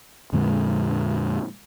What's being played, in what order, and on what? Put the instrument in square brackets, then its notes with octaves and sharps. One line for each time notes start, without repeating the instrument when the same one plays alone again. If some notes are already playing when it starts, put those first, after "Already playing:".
[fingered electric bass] F2 A#2 D3 G#3